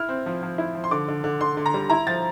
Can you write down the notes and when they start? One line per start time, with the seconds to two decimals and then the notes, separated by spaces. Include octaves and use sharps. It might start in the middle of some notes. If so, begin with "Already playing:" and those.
Already playing: E4 F6
0.09 C4
0.26 F3
0.43 F3
0.58 E4
0.75 F3
0.84 C6
0.91 D3 D6
1.08 D3
1.24 D3
1.41 D3 C6
1.57 D3
1.66 A#5
1.74 G3
1.90 E4 A#5
2.07 F3 A6